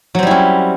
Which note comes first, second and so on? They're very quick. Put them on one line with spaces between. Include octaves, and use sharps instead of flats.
F#3 C4 G3 E4 C#4